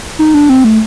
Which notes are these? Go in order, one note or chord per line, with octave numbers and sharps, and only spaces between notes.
D#4
D4
C4
A3